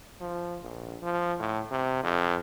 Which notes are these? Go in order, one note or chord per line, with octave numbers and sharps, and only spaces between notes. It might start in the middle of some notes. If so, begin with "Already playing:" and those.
F3
A#1
F3
A2
C3
F2